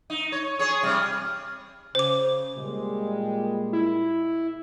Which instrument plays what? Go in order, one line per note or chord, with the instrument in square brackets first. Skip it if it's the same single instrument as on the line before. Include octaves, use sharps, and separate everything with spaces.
[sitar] D#4
C#5
G#4 C#5
C3 G3
[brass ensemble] C#3 [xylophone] C5 D6
[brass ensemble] A#2 G3 G#3
[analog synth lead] E4